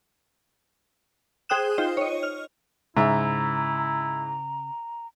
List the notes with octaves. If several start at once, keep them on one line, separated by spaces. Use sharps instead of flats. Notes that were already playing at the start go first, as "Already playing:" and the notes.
G#4 C5 G5 D#6 F#6 E7
D#4 F4 C5 G5
C#5 D#5
F6
G#2 C#3 E4 E5 A#5